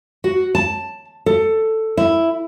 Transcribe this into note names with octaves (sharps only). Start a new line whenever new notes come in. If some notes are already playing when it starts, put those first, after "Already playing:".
F#4
A5
A4
E4